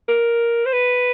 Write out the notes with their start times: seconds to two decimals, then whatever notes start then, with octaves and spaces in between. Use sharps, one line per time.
0.09 A#4
0.65 C5
0.73 B4